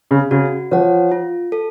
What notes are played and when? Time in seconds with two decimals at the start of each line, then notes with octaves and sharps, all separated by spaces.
0.11 C#3
0.31 C#3 F#4
0.71 F3 C#5 F#5
1.12 F4
1.52 A4